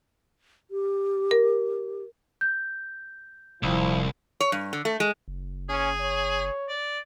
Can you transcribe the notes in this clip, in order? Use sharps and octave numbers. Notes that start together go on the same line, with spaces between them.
G4
A#4
G6
D#1 C2 F3 E4
C#5
G2
D3
A3
G#3
F#1
C#4 G#4
C#5
D5